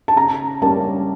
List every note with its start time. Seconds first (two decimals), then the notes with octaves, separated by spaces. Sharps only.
0.08 A5
0.16 C#3 A#5
0.62 G3 A#3 C#4 A5